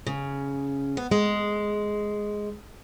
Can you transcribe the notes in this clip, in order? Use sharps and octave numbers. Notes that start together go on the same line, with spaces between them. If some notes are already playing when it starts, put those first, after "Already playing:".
C#3
B3
G#3